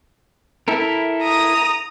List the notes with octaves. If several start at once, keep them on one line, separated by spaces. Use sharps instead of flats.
E4 A4 A#4
A#5 D#6